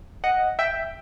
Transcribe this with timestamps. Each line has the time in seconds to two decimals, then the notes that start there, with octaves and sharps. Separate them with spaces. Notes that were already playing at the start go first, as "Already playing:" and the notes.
0.24 D#5 F#5
0.59 E5 G5